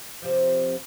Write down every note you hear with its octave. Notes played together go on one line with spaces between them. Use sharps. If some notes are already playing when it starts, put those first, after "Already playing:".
C3 F3